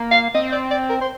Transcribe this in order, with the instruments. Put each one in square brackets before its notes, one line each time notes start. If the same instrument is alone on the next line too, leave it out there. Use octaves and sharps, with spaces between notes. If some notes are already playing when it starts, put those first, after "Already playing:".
Already playing: [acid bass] A#3
[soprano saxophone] F5
[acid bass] C4 [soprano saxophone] D#5
[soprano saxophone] D5
D5
A#4
C5